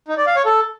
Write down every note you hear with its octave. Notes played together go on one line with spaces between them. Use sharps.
D#4
D5
F5
C#5
A4